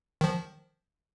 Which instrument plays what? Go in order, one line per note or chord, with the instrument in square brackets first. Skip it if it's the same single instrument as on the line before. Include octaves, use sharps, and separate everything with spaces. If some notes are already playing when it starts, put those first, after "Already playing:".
[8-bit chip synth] D#3 F3